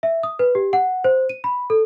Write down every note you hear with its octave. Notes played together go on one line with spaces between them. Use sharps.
E5
D#6
B4
G4
F#5
C5
D#7
B5
A4